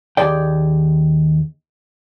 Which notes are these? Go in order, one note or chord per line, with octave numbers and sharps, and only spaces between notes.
D#2 G#4 D5 G5